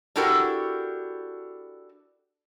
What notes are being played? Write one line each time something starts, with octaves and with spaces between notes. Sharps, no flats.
D4 E4 F#4 G4 A4 A#4